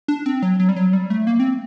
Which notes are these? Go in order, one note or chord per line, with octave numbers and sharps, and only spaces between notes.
D4
C4
F#3
F#3
G3
F#3
G3
A3
A#3
C4